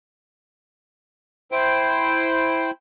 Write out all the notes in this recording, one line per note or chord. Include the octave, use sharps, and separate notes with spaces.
E4 C5 G5